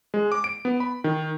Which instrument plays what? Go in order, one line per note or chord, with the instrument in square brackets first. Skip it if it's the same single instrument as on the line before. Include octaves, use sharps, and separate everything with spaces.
[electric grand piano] G#3
D6
D7
B3
B5
D#3